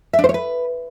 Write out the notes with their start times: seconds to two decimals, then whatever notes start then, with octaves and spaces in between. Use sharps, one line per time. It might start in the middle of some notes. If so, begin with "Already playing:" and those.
0.13 E5
0.19 D4
0.24 C5
0.29 C#5
0.34 B4